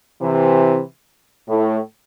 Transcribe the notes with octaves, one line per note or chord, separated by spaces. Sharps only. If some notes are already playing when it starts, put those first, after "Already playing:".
C3 E3
A2